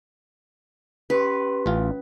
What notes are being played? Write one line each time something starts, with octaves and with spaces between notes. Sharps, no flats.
C#4 G4 B4 C6
A1 C#4 F4